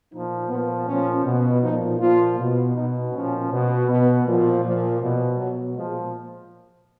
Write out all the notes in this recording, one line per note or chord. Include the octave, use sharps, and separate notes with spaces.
A#2 F3 D#4
A#2 F3 B3
A#2 F3 C#4
B2
A#2 F3 D#4
A#2 F3 F4
B2
B2 D#4
A#2 F3 C#4
B2
B2 B3
A#2 F3
A#2 F3
B2 F3
B2 F#3
A#2 F3 G#3